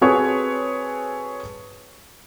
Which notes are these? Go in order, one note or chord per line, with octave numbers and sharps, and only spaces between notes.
C4 F#4 G#4 A4 B4 C#5